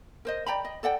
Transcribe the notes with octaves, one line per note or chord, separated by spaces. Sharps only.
A#4 C5 D#5
D5 G5 A#5 B5
D#5
A4 D5 F#5 G5